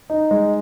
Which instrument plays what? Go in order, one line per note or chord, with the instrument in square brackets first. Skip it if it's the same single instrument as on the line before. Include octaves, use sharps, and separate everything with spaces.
[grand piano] D#4
G#3